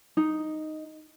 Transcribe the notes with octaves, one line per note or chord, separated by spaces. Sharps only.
D#4